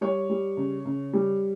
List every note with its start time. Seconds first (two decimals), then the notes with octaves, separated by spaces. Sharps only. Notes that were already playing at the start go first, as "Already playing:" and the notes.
0.01 G3 C#5
0.30 G3
0.57 C#3
0.85 C#3
1.13 G3